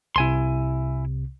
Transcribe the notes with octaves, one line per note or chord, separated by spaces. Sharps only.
C2 C3 E4 G#5 C6